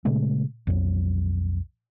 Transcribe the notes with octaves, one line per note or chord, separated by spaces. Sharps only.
A#2 C#3 G#3 A3
B1 F2 F#3